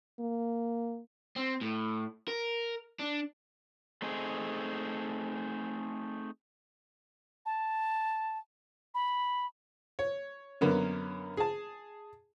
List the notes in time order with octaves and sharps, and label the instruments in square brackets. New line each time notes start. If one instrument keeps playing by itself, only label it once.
[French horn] A#3
[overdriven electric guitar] C4
A2
A#4
D4
[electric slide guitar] A3 C4 D#4 G#4
[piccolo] A5
B5
[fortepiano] C#5
F#2 D3 A#3 B3 C#4
G#4 A5